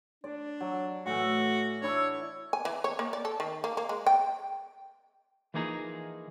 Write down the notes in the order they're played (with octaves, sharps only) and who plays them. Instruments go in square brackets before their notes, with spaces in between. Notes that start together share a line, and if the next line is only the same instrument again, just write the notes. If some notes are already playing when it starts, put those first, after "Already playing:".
[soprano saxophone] D4 [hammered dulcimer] D5
[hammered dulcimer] F#3
[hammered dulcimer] A2 E3 [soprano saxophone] F#4
[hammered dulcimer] D4 E4 [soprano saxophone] C#5
[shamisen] G#5
E3
C#5
A#3
D5
A4
D#3
A#3
A#3
G#3
G5
[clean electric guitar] E3 F3 A#3 D#4 G#4 A#5